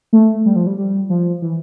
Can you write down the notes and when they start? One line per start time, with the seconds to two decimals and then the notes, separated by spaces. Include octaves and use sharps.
0.13 A3
0.46 G3
0.56 F3
0.67 G3
0.78 G3
1.10 F3
1.42 E3